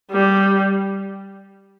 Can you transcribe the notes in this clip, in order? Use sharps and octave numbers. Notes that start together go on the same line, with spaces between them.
G3